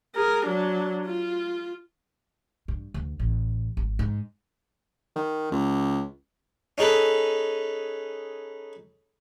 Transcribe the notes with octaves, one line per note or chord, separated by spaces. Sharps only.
G#4 A#4
F#3 D4
F4
G2
D2
A1
G#1
G#2
D#3
C#2
C#4 D#4 G#4 A4 B4